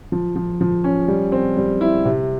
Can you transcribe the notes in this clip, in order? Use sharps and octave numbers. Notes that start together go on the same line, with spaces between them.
F3
F3
F3
C#4
G3
C4
G3
E4
C3